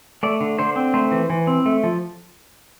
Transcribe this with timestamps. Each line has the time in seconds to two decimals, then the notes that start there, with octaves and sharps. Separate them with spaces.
0.23 A3 D5
0.41 D3
0.59 D3 C5
0.76 C4
0.94 A3 C5
1.12 E3
1.30 E3
1.47 C4
1.66 A3
1.84 F3